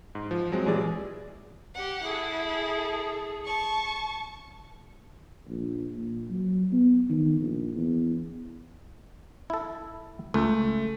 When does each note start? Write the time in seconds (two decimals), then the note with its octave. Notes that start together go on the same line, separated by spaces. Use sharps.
0.15 G#2
0.31 F3
0.52 F#3 G#3 C4
0.66 A#1 E3 G3 G#4 D5
1.75 G4 F#5
2.04 E4 G#4 A4
3.45 A5 C#6
5.48 A#1
5.97 A#2
6.30 F#3
6.73 B3
7.10 D#3
7.40 A#1
7.75 E2
9.50 E4 A4
10.34 C#2 A3